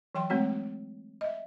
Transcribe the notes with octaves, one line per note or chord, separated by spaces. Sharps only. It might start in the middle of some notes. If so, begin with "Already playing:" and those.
E3 F#3 G5 C6
G#3 A3 C4 F#4 C#5
D#5 E5